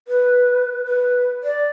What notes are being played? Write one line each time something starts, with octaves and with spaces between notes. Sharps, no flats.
B4
B4
D5